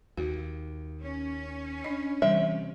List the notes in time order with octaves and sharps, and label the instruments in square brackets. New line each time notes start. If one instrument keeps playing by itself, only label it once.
[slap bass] D#2 [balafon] F#4
[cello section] C#4
[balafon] D4 D#5
[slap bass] C3 [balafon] E3 G3 [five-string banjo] E5